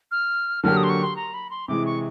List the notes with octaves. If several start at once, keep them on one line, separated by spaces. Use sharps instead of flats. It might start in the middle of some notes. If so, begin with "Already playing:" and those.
F6
D3 F#3 A#3 D4 G4 F6
D#6
C6
C#6
C6
A#5
B5
C6
C3 E3 G#3 D6
C#6